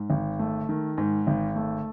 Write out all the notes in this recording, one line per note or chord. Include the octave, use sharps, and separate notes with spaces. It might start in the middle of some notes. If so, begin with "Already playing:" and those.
Already playing: G#2
G#1
A3
D#3
G#2
G#1
A3